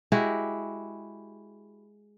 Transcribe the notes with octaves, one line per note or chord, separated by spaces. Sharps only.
G#3 E4 F#4 G4